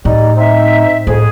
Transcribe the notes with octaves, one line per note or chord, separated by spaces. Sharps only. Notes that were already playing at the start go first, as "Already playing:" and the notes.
A2 G3 D#4 D5
C4 D#4 E5
F2 A2 G#4